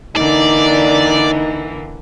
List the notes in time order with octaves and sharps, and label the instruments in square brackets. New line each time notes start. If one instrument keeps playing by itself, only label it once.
[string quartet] D3 E3 A#3 [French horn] D#4 [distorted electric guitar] D5